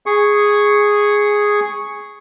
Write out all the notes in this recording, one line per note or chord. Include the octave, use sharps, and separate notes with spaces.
G#4 C#6